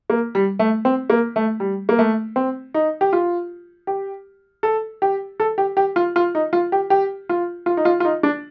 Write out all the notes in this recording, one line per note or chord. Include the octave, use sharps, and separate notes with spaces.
A#3
G3
A3
C4
A#3
A3
G3
A#3
A3
C4
D#4
G4
F4
G4
A4
G4
A4
G4
G4
F4
F4
D#4
F4
G4
G4
F4
F4
D#4
F4
F4
D#4
D4